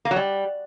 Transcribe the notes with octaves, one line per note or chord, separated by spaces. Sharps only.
A#3
F#3
G3